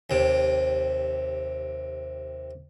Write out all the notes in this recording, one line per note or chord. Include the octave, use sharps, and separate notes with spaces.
D#2 C3